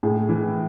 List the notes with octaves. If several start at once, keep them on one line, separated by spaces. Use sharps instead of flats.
A2 G#4
E3